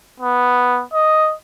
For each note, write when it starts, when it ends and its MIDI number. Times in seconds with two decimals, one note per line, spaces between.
0.20 0.83 59
0.94 1.34 75